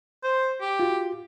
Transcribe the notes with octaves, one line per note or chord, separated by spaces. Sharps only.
C5
G4
F4 F#4